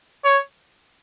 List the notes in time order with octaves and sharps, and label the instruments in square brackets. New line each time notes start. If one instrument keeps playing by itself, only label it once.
[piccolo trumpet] C#5